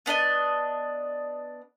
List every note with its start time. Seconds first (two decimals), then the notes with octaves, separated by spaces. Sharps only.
0.06 B3 D4 A#4 D#5